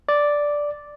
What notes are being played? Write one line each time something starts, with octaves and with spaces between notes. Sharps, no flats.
D5